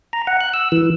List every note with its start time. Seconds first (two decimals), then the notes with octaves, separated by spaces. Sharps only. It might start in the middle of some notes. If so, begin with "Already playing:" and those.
0.13 A#5
0.27 F#5
0.41 F#6
0.54 E6
0.72 E3